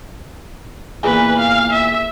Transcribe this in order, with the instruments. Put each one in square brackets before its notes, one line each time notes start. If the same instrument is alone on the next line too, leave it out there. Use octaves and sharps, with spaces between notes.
[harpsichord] E2 A#2 E3 [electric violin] B4
[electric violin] F5
E5